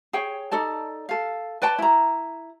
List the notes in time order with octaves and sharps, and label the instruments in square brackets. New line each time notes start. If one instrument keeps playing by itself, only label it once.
[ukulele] G#4 C#5 G5
D#4 A4 D5 A5
A4 F5
B4 D5 G5 A5
E4 A#5